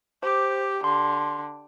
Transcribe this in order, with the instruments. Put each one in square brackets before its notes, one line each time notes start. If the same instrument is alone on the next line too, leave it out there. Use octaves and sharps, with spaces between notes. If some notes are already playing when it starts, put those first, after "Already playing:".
[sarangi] G4 [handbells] C5 D6
[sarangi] D3 [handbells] C6